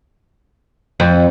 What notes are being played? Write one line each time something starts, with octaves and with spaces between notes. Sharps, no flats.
F2